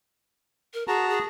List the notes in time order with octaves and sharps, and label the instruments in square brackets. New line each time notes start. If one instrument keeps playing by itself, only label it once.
[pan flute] A#4
[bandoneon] F#4 A5 A#5 [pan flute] G#4
[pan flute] G#4